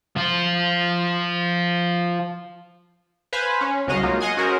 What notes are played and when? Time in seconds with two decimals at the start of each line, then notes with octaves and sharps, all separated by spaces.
0.17 F3 F4
3.33 B4 C5 F5 G#5 B5
3.61 C#4
3.87 C2 C#3 F#4 D#5 F5
4.03 F#3 G#3 A#3 D#4 F4
4.20 D#5 F5 F#5 G#5 C6 D#6
4.37 C#4 F#4 G#4 A#4 C5